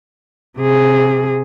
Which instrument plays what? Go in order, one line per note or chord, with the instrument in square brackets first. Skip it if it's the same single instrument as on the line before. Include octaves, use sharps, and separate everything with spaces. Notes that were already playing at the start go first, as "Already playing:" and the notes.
[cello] C3 G#4